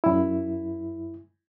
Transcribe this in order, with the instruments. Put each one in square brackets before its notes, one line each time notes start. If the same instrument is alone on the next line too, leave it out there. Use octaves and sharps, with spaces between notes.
[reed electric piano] F#2 E4